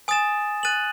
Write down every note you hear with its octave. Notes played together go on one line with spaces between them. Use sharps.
G#5 D#6 A6 E7
F#6 A6 D#7 F#7